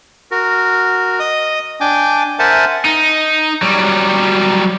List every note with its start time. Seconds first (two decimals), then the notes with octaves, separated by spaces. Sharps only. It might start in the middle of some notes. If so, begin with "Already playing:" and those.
0.31 F#4 A#4
1.19 D#5 D#6
1.81 D4 G5 G#5 D6
2.39 A#4 C5 E5 F#5 G#5 A5
2.85 D#4
3.62 F#3 G3